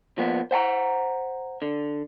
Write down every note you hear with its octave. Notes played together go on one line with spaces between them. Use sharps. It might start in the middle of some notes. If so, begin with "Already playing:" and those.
F3 A#3 B3
C5 F#5 G#5 A#5
D3